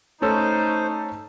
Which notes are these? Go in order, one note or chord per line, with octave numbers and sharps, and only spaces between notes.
A3 C#4 D#4 A4 C5